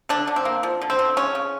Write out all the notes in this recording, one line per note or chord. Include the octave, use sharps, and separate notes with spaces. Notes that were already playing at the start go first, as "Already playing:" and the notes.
D3 D4
D3
C4
A#3
F3
D3
C4
D3
C#3 C#4
C#3